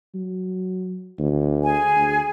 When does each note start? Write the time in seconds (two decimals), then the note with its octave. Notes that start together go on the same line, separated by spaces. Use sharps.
0.15 F#3
1.19 D2
1.63 G#4 G#5
1.96 D2